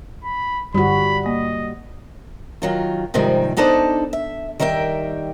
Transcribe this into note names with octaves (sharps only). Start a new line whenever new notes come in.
B5
G2 D3 G3 F#4 B5
A#3 D#5
D#3 F#3 F4
G#2 C3 D#3 F3 G3
B3 D4 D#4 A4 C5 D5
E5
D#3 G3 A#4 E5 G5